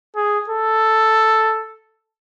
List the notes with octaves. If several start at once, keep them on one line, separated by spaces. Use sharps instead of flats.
G#4
A4